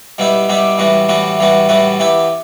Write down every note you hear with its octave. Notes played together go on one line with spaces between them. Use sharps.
B2 G3 B3 E4 G4
B2 G3 B3 E4 G4
A2 E3 G3 B3 F#4
A2 E3 G3 B3 F#4
A2 E3 G3 B3 F#4
A2 E3 G3 B3 F#4
E3 B3 E4 G4